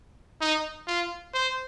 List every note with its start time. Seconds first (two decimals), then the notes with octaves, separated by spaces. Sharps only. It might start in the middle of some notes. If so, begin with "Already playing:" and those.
0.41 D#4
0.87 F4
1.34 C5